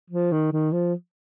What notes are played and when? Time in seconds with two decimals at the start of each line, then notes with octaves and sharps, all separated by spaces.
0.10 F3
0.32 D#3
0.52 D#3
0.72 F3